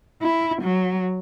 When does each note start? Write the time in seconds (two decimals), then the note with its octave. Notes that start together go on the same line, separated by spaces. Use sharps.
0.22 E4
0.62 F#3